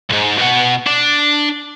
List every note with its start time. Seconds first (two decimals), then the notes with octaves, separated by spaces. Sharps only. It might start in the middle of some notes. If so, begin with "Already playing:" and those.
0.10 C2 G#2
0.38 B2 F#5
0.87 D4